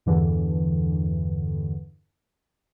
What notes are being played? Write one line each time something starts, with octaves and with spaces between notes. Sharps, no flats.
E2 G2 D3 E3